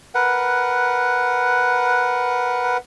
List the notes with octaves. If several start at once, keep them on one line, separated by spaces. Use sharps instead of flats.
A#4 B4 F#5